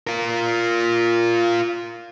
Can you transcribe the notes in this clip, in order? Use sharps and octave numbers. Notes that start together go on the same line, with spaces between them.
F4 A#4